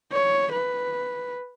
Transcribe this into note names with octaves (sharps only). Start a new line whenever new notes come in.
C#5
B4